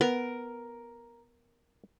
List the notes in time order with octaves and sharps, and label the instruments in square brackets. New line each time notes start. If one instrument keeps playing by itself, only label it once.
[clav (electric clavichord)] B3 [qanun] A#4